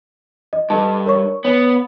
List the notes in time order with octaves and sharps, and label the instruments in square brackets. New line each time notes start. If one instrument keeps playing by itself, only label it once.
[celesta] D#5
[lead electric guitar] G2 [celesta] A4 D#5 A5
[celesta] A#4 C#5 C#6
[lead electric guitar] B3 [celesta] C#5